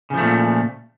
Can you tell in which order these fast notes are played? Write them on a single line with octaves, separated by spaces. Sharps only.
C#3 F3 A3 A#2